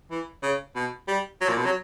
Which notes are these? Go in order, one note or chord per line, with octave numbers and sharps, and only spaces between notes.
E3
C#3
B2
G3
F#3
A#2
B2
F#3